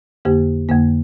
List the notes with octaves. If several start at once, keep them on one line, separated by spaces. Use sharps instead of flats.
F2 D3 A#3 G4
F2 D3 A#3